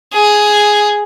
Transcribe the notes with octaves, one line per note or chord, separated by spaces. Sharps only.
G#4